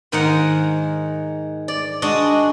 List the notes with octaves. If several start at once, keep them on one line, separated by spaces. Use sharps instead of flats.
G#2 D#3 G#3 A#4 F5 F#5
D5
G#3 D4 F#4 D#5